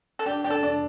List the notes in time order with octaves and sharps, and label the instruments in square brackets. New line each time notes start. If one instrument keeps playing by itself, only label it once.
[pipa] A4
[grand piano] D4 [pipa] G4
[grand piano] D4 [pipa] G4
[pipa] A4
[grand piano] D4